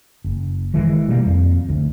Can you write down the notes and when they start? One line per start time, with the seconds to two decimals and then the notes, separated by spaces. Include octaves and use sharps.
0.24 F#1
0.74 D#3 E3 G#3
1.08 B2 G3 A3 A#3
1.26 F2
1.69 D2